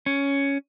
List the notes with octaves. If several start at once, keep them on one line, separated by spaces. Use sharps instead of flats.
C#4